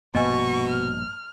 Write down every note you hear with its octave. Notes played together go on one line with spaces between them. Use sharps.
A#1 G2 B2 A#3 D#5 G#5 C#6
F6